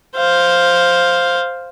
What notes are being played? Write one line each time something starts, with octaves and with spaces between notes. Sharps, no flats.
C5 F5